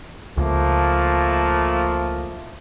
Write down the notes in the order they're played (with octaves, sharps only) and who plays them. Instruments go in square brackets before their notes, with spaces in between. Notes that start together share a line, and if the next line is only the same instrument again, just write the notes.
[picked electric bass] C#2 [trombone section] F3 A3 A#3